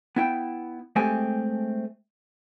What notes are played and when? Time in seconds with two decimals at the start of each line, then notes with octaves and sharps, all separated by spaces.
0.16 B3 E4 G5
0.96 G#3 A3 C4 G4 A4 G#5